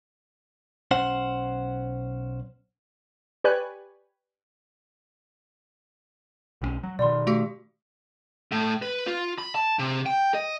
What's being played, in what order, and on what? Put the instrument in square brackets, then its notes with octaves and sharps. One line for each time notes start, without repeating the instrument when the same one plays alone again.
[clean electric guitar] B1 C#4 C5 F#5
[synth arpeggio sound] G4 B4 C#5 D5 G#5 F#6
[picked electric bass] B1 E3 C#4
F#3
[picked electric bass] B2 D#3 [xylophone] D5 B5 C6
[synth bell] A3 F#4 G4
[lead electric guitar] A2
B4
F4
B5
A5
C3
G5
D#5